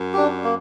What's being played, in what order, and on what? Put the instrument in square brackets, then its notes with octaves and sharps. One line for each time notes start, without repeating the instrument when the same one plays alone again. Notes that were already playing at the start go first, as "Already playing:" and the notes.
Already playing: [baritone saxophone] F#2
[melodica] D4 G4
A#3